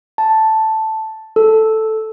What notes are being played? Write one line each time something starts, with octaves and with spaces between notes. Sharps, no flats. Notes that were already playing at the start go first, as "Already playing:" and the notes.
A5
A4